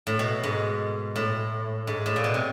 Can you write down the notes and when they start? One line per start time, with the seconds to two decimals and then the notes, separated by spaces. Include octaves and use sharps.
0.07 A2
0.19 B2
0.44 G#2
1.16 A2
1.87 G#2
2.06 A2
2.16 A#2
2.24 B2
2.34 C3